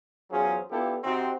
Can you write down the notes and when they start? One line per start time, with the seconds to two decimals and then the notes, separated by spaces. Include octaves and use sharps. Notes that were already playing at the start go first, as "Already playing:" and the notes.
0.31 E2 F#3 C#4 F4 G#4 C5
0.70 B3 D4 E4 F4 G4 A4
1.03 C3 C4 D#4 F#4 G4 C5